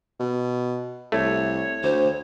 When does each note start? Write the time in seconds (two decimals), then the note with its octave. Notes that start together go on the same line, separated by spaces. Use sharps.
0.20 B2
1.12 C2 A3 C#5
1.83 D2 C5